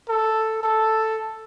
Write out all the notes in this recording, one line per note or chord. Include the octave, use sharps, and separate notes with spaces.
A4
A4